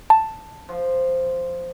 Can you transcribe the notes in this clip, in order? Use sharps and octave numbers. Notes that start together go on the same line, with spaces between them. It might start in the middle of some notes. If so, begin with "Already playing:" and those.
A5
F3